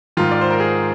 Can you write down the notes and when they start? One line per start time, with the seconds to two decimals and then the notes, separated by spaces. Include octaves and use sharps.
0.17 G#2 D#3 F4
0.31 D5
0.41 C5
0.51 A#4
0.60 G#4